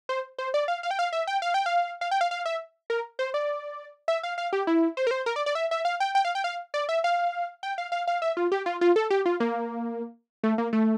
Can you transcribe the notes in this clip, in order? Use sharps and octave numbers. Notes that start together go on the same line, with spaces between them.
C5
C5
D5
F5
F5
G5
F5
E5
G5
F5
G5
F5
F5
G5
F5
F5
E5
A#4
C5
D5
E5
F5
F5
G4
E4
C5
A#4
C5
A#4
D5
D5
E5
E5
F5
G5
G5
F5
G5
F5
D5
E5
F5
G5
F5
F5
F5
E5
F4
G4
F4
F4
A4
G4
F4
A#3
A3
A#3
A3